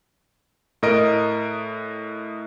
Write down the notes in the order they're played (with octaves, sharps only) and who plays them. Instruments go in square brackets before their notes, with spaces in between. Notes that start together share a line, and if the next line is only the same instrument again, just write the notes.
[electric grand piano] A2 A#4 D#5 D7